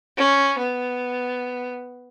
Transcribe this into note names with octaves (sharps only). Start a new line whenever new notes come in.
C#4
B3